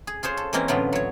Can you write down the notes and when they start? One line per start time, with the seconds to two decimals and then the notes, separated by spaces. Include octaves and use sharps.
0.07 G#4
0.23 F4 G#4 C5 C#5
0.37 A4
0.53 E3 G#3 A#3 C4 C#4
0.68 A2 D3 E3 F#3 B3 F4
0.93 F#3 C#5